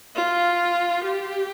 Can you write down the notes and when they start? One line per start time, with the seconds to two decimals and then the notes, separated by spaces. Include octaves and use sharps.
0.16 F4
1.04 G4